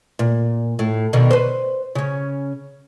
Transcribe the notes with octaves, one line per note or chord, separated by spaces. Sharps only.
A#2
A2
B2 D3 D#3
B4 C5
C#3 C#4